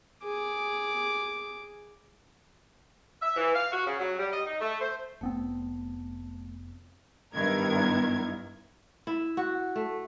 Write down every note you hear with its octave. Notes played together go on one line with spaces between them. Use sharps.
G#4 D6
E5
E3
F5
F#4
C#3
F#3
G3
D#5
D#4
A3
C5
F1 A3 B3 C4
G2 D#3 B3 E4 A#4 G#6
E4
F#4
A3